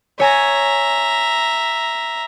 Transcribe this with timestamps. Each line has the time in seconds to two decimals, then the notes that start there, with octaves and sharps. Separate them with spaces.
0.20 C#5 E5 G#5 A#5